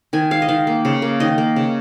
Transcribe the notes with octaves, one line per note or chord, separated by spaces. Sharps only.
D#3 G#5
G#3 F5
D#5
D#3 F5
A#3
C#3
A#3
D#3 D#5
A#3
C#3